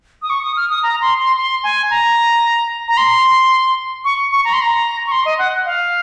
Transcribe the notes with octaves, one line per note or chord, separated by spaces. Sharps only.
D#6
C#6
D#6
F6
D#6
A#5
C6
C6
C6
G#5
A#5
A#5
C6
C#6
C#6
A#5
C6
A#5
C#6
C6
D#5
F#5
F5